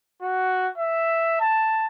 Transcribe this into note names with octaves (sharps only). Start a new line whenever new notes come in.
F#4
E5
A5